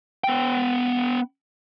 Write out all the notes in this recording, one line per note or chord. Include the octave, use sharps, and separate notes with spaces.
B3 G5